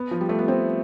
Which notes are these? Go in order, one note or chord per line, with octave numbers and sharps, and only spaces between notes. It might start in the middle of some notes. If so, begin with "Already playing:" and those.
Already playing: B3
F3
G3
A3
B3
C4